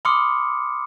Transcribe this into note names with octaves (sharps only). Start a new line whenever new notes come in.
B5 C6 D6 D#6 F6 C#7